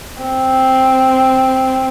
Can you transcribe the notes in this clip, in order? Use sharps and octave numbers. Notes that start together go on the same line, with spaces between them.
C4